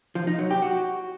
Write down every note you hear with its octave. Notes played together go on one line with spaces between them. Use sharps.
F3
D#4
F#3
G4
F#4